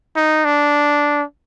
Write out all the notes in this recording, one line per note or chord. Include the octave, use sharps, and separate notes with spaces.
D#4
D4